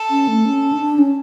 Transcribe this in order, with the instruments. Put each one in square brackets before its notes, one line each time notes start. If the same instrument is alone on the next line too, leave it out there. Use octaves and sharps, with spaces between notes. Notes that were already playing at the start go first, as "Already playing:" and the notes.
Already playing: [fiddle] A4
[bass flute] C#4
A3
C#4
D4
C#4